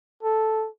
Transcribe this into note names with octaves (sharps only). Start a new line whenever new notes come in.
A4